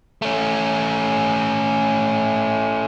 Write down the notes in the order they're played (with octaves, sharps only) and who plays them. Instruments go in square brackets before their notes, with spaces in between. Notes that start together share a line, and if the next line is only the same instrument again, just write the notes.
[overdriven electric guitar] A3 C#4